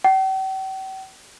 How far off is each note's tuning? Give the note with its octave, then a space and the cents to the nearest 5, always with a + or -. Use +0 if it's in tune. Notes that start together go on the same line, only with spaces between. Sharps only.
G5 -45